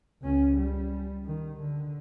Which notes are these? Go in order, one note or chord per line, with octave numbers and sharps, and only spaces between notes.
C#2 C#4
G3
D#3
D3